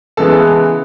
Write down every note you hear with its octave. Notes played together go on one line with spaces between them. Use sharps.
C#3 E3 G#3 B3 A4 A5